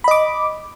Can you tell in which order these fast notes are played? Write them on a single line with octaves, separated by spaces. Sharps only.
B5 D#5 D6